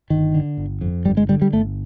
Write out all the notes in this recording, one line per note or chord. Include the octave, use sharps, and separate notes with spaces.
G1 D#3
D3
G1
F2
G1 G3
G#3
D3 G3
G3
G1 A3